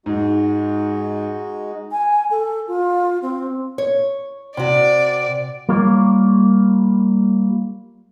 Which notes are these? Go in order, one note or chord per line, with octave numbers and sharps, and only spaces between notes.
G#2 G#3 D#4 F#4
G#5
A4
F4
C4
C#5
C3 F#4 D5
G3 A#3 F4 A#4 C#5